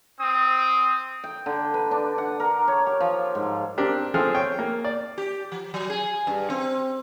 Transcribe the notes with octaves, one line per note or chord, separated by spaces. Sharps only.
C4 D#6
G5
D3
B4
D4
F#5
A#4
C#5
G4
F3
G#2
C4 D4 G4 A#4
F3 C4 G#4 A4 C6 F6
C#5 G5
A#3
D5
G4
F3
F#3
G#4
G2
C4